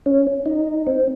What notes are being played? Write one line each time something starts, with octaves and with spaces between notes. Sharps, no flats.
C#4
D#4
C4